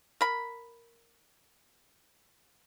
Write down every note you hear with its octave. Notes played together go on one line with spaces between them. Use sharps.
A#4 B5